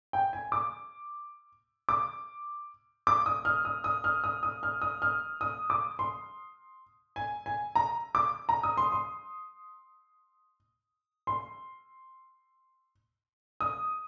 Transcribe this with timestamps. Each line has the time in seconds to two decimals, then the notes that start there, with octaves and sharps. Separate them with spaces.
0.13 G5
0.33 G#5
0.52 D6
1.89 D6
3.07 D6
3.26 D#6
3.45 F6
3.65 D#6
3.84 D#6
4.04 F6
4.24 D#6
4.43 D#6
4.63 F6
4.82 D#6
5.02 F6
5.41 D#6
5.70 D6
5.99 C6
7.16 G#5
7.46 G#5
7.75 A#5
8.15 D6
8.49 A#5
8.63 D#6
8.77 C6
8.92 C6
11.27 C6
13.61 D#6